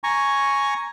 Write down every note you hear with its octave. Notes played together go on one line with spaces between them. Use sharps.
G#5 A#5 C#6